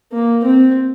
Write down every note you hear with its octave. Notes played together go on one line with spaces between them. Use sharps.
A#3
C4